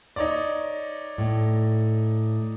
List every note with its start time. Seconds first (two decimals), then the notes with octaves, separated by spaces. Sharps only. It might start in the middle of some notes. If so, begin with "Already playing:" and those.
0.16 D#4 C#5 D5
1.18 A2